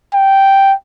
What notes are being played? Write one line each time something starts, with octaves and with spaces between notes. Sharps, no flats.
G5